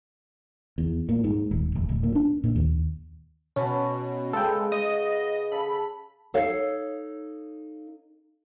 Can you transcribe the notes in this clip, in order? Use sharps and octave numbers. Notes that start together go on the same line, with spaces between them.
E2
A#2
G#2
D#1
F1
D1
A#2
D4
A#2
D#2
B2 C#4 F#4 B4 A5
C#3 G#3 A4 B4 G5
D#5 D#6
C#3 A4 B5
D#4 A4 C#5 F5